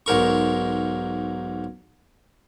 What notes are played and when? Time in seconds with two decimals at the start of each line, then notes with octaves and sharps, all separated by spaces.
0.06 B1 G#2 A#4 C#6